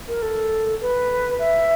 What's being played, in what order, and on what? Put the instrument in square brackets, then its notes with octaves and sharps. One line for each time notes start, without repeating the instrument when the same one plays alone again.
[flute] A#4
A4
B4
E5